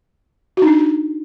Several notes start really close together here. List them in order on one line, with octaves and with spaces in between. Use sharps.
F#4 D#4 D4